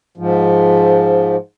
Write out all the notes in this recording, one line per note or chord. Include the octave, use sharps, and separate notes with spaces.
G#2 F3